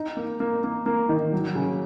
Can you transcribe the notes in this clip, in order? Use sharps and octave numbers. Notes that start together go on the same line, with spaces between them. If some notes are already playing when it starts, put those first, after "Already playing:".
Already playing: D#4
A#3
A#3
A#3
A#3
D#3
F#3
C#3